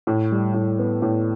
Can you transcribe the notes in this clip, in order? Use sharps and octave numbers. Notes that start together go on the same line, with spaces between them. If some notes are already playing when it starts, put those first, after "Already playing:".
A2
G3
A2
B3
A2